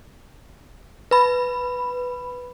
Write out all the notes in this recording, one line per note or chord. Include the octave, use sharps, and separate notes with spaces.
B4 B5